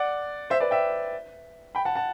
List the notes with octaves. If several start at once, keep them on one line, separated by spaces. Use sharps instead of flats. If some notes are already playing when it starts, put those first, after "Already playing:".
Already playing: D5 F#5
C5 E5
B4 D5
E5 G5
G5 B5
F#5 A5
F#5 A5